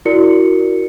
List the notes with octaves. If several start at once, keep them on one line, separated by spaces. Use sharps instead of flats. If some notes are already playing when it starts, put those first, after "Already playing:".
E4 F#4 A#4 D5 C#7